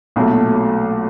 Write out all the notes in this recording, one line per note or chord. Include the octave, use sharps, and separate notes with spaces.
B1 A#2 F#3 A3